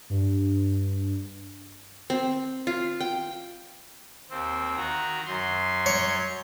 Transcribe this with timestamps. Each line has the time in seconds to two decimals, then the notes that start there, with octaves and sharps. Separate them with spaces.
0.10 G2
2.10 C4
2.67 F4
3.00 G5
4.30 D#2 C4
4.77 D#3 F#4 A#5
5.26 F#2 C6
5.86 C#5